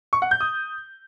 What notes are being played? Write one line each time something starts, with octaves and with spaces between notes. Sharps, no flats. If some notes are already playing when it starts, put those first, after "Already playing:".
C#6
F#5
G6
D#6